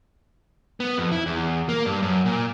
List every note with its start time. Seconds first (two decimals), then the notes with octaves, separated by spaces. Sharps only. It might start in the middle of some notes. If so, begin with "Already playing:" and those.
0.80 B3
0.98 F2
1.12 E4
1.26 E2
1.69 A#3
1.86 G2
2.02 F#2
2.26 A#2